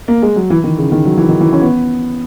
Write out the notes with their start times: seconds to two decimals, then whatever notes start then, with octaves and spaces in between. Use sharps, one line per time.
0.08 A#3
0.22 G#3
0.36 F#3
0.50 E3
0.64 D#3
0.78 C#3
0.92 D#3
1.05 F#3
1.18 E3
1.29 D#3
1.41 E3
1.53 C#4
1.62 B3